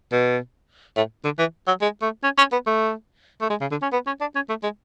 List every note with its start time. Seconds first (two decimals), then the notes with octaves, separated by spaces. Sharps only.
0.12 B2
0.97 A2
1.25 D3
1.39 E3
1.67 F#3
1.81 G#3
2.02 A3
2.24 C#4
2.38 C#4
2.52 B3
2.66 A3
3.41 A3
3.50 G#3
3.61 C#3
3.71 D3
3.82 C#4
3.93 B3
4.07 C#4
4.21 D4
4.35 C#4
4.49 A3
4.63 G#3